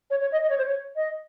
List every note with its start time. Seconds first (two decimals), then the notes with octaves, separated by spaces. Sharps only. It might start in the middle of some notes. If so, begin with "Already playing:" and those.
0.10 C#5
0.21 C#5
0.32 D#5
0.43 D#5
0.50 C#5
0.58 C5
0.65 C#5
0.96 D#5